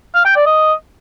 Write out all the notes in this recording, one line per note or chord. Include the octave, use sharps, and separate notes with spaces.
F5
G5
D5
D#5